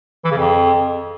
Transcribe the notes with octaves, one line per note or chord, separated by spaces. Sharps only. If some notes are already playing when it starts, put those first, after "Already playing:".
E3
C#3
F2